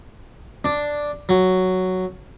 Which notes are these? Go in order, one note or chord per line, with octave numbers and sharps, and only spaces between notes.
D4
F#3